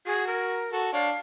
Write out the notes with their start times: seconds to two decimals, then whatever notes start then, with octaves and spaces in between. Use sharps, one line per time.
0.07 F#4 G#4
0.27 A#4
0.73 F#4 A4
0.93 D4 C#5 F5